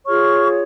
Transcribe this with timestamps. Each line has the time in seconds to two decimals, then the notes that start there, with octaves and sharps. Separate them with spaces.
0.06 F4 G#4 C#5 C#6 F6